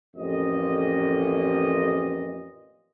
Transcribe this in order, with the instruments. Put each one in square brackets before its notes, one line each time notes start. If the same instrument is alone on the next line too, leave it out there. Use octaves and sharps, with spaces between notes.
[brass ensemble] A1 F2 A#2 D#5